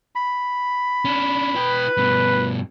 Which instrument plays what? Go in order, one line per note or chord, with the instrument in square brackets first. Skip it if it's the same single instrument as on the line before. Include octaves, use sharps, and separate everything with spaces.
[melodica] B5
[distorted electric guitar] C#4 D4
[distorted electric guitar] E4 G5 [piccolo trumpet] B4
[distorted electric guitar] G2 B2